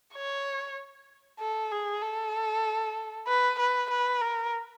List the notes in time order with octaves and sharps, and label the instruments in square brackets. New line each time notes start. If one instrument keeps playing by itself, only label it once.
[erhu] C#5
A4
G#4
A4
B4
B4
B4
A#4